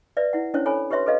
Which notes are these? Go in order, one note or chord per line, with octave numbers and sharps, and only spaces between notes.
B4 D5 E5
E4 F#5
C#4 D4 E4 C5 C#5
A4 C#5 G#5 B5
G4 B4 C#5 E5 C6
A4 B4 D#5 F5